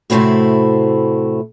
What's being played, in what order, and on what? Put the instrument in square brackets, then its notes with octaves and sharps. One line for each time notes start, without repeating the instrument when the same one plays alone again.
[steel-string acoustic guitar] A2 C3 A3 C4 E4 F#4